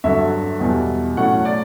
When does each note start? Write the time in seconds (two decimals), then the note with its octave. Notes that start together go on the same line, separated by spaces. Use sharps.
0.04 G2 D3 F#3 E5
0.60 E2 B2 G3 B3
1.17 A2 F#3 A3 C#4 F#5
1.45 D5